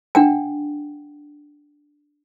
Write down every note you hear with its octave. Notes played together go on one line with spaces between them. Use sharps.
D4 F#5 G5